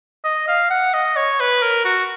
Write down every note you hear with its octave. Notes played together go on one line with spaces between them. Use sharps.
D#5
F5
F#5
D#5
C#5
B4
A#4
F#4